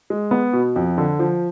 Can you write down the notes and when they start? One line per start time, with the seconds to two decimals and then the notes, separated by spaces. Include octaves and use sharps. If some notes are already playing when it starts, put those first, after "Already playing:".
0.10 G#3
0.31 B3
0.53 B2
0.76 F2
0.98 D3
1.19 F3